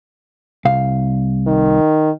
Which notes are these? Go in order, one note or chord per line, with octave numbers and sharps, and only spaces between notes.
C2 F5
D#3